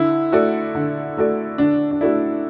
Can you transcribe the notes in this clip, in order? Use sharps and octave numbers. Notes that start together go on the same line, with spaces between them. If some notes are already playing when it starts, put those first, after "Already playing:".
Already playing: D3 E4
A3 F#4 A4 D5
D3
A3 F#4 A4 D5
D3 D4
D4
A3 E4 F#4 A4 D5